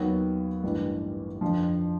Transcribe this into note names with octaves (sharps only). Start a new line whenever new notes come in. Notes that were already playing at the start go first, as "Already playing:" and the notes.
Already playing: D#2 D#3 F#3 B3
A1 G2 E3
F2 D3 F3